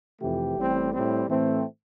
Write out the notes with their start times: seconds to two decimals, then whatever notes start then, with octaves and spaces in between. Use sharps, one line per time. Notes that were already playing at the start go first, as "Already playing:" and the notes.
0.20 F2 C3 E3 A3 G4
0.56 A1 A2 G3 C4
0.92 A2 G3 C4
1.28 A2 E3 A3 C4